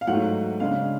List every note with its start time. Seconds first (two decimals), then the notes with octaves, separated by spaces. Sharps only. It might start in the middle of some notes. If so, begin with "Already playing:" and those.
0.01 F5
0.07 G#2 F#3 A3 F#5
0.60 C#3 G#3 D4 F5